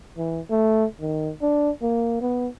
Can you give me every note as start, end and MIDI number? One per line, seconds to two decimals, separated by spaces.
0.18 0.40 52
0.50 0.85 57
1.01 1.31 51
1.42 1.70 62
1.82 2.18 58
2.21 2.47 59